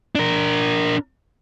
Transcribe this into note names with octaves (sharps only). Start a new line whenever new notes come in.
D4 A#4